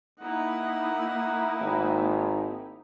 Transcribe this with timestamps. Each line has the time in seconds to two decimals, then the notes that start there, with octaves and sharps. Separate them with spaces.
0.21 A#3 D#4 E4 F#5
1.60 G#1